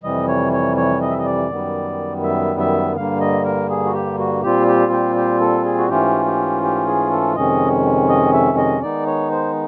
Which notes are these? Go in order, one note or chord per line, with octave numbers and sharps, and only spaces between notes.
F2 C3 E3 G3 D#5
C#5
C#5
C#5
D#5
E5
D#5
D5
F#2 D#3 G3 B3
E5
E5
G2 D3 G3 A#3 F5
D#5
A#4
G#4
F#4
G4
F#4
A#2 G3 C4 F4 G4
G4
G4
G4
A4
G#4
F#4
G#2 E3 A3 C#4 F4 G4
G4
G4
G#4
A4
F2 C3 D#3 G#3 C#4 D#5
D#5
E5
D#5
D#3 G#3 B3 D#4 D5
C#5
C5